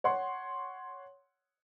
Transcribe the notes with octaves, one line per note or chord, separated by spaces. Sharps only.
C#5 F#5 C6